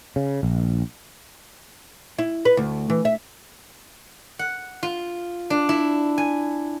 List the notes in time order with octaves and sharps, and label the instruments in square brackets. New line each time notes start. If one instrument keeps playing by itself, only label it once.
[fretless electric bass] C#3
A#1
[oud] E4
B4
D2
E3
E5
[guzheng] F#5
F4
D4
E4
G#5